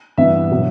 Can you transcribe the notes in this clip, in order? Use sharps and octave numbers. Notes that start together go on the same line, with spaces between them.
G2 E3 B3 E5
B2 F#3 B3